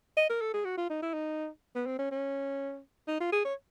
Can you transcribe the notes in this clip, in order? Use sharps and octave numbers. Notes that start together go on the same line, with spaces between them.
D#5
A#4
A4
G#4
F#4
F4
D#4
E4
D#4
B3
C4
C#4
C#4
D#4
F4
G#4
C#5